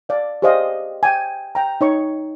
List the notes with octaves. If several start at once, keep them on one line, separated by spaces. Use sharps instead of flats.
D5 F5
G4 G#4 C5 D5 D#5 F5
G5 G#5
G5 A#5
D#4 C#5 C#6